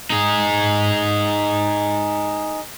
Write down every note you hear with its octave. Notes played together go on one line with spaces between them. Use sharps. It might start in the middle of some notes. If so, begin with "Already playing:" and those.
D#4 G#4